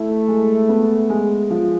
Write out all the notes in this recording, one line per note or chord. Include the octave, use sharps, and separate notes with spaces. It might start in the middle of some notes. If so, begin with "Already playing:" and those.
Already playing: A3 E4
G#3
B3
G#3
F3